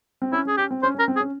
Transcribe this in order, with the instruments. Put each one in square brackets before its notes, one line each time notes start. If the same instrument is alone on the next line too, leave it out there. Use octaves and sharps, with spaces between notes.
[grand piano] C4
[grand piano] C#4 [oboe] E4
[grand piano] C#4 [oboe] G#4
[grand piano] C#4 [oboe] G4
[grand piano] C4
[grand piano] C#4 [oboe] C5
[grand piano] C#4
[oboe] A#4
[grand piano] C4
[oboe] G#4
[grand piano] C#4